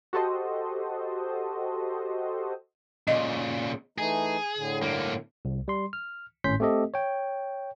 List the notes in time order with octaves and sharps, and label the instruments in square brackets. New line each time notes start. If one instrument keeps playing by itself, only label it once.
[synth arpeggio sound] F#4 G4 A4 C5 D#5
[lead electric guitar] A#2 C#3 [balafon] D#5
[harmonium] E3 A3 D#4 [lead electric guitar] G#4
[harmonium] A2 D3
[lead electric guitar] G2 A#3
[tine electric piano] C2
G3 C6
F6
G#1 A2 C#4 C6 G6 B6
A3 C4 G4 A4 D#5
C#5 G5